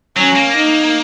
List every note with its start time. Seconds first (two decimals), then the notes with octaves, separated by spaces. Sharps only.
0.17 F#3 C#4
0.36 A#3
0.56 D#4